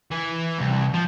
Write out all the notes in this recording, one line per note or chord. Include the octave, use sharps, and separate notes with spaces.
E3
C2
F3